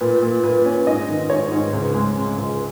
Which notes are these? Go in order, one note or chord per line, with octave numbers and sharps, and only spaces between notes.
A#2 B4
A#2
A#2 B4
C#4
G#2 D#5
D#3
G#2 C#5
G#2
C#2
G#3
C#3
C#2